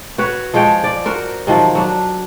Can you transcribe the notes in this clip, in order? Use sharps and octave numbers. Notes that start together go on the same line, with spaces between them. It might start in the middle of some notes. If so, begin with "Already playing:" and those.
F#4 B4 C#5
F3 G#3 C#5 G5
D5
F#4 A#4 C5
C3 D#3 F3 F#3
F#3 D4